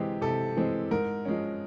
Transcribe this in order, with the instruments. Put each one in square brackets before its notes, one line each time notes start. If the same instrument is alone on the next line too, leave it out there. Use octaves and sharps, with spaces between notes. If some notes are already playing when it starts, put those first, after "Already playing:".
Already playing: [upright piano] C3 E3 G#3 C4 [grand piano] G4
[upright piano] C3 [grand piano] A4
[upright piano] E3 G#3 C4
[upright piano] G#2 [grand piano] A#4
[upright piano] F3 G#3 C#4